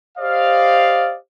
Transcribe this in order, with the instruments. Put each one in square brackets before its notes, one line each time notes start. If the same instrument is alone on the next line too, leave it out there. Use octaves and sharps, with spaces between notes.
[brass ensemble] G4 C5 D5 D#5 F5